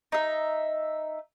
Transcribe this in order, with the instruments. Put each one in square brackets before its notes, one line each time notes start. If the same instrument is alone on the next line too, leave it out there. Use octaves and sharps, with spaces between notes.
[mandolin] D#4 E5